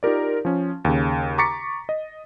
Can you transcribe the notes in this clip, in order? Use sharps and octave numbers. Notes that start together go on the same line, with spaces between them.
D#4 F4 G4 A#4 D5
F3 C#4
D#2 C#3
A#5 C#6 D6 A6 B6 C#7
D#5